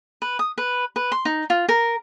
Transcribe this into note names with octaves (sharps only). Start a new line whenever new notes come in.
B4
D#6
B4
B4
C6
D#4
F4
A#4